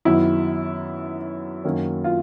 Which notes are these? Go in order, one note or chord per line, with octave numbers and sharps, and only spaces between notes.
F#2 D#3 F#3 B3 E4
F#2 D#3 F#3 A#3 C#4
F4